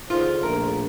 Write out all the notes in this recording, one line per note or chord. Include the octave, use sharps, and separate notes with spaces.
D3 F4 G#4 C5
A#1 A3 A#4